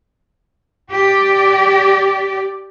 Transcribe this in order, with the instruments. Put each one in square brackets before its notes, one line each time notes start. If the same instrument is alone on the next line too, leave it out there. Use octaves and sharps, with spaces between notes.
[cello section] G4 D5